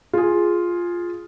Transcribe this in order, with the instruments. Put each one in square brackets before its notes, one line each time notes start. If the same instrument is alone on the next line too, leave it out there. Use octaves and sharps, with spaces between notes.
[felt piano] F4 G#4